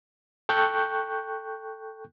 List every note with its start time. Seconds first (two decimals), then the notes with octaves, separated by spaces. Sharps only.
0.49 A4 G5 C#6 F#6 G6